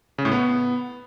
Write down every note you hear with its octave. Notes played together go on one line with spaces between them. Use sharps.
C#3
A2
B3